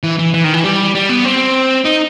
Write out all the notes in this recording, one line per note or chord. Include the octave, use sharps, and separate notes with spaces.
E3
E3
E3
D#3
E3
G3
G3
B3
C4
D#4